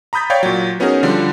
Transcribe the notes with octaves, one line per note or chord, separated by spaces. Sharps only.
A#5 B5 D#6 G6 A6 B6
C#5 D5 F5 G5 G6 G#6
A#2 F#3
B3 C#4 D#4 F#4 G#4 A#4
D3 F3 G3 D4